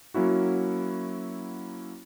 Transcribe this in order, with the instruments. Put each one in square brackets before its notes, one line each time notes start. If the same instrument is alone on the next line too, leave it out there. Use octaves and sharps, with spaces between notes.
[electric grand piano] F#3 A#3 C#4 E4 F#4